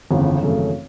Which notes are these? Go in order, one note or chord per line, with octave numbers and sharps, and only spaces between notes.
G1 F2 C#3 E3
G#1 F#2 C#3 E3 A3